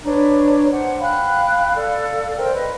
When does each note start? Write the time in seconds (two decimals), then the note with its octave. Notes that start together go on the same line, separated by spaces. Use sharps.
0.05 D4 B4 C#5 A#5
0.70 C5 F#5
1.01 F5 G5 B5 F#6
1.77 A4 D5 F5
2.37 A#4 C5 G5
2.54 B4 D#5